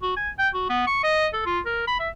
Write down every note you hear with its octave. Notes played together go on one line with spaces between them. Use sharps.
F#4
G#5
G5
F#4
B3
C#6
D#5
A4
F4
A#4
B5
E5